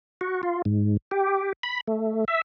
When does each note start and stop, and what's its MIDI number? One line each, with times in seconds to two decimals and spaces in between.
0.21 0.41 66
0.43 0.62 65
0.65 0.97 44
1.11 1.53 67
1.63 1.81 83
1.87 2.25 57
2.28 2.41 76